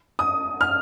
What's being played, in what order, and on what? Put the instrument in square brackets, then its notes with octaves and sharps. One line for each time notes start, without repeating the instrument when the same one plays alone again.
[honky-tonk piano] D#6
F6